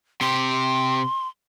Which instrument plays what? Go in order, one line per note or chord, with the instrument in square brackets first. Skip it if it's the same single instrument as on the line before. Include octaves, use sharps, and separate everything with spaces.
[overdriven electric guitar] C3 G4 [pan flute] C6